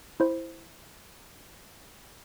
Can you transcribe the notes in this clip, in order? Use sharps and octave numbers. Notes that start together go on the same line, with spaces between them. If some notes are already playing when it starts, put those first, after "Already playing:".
E4 C5